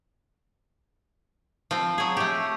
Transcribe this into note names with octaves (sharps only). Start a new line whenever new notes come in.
F3 C4
F#3 G#4
A3 G4